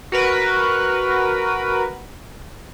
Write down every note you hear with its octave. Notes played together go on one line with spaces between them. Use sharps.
F#4 A#4 B4